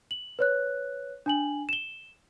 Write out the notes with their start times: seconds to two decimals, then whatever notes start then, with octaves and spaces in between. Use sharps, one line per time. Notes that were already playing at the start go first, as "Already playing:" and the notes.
0.11 F#7
0.39 B4 C#5 F#6
1.26 D4 G#5 F#7
1.69 E7 G7